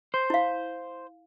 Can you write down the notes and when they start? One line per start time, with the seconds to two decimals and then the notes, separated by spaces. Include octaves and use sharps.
0.14 C5
0.30 E4 F5